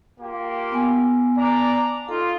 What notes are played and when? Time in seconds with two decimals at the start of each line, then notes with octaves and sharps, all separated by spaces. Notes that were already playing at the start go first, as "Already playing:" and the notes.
0.20 A#3 F4 G4
0.72 B3 G#5
1.37 D4 D5 A#5
2.08 D#4 F4 A4